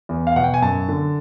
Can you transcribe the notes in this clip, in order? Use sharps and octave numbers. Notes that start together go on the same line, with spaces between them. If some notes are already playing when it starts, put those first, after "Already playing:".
E2
F5
B2 F#5
G5
G#5
F#2 A5
D3